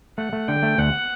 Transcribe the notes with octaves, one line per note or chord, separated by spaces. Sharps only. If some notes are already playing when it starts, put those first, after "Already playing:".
A3 F#5
A3
D3 G5
A3
D2 F#5